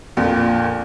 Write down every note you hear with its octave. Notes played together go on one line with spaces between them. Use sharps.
A#1 F2 A#2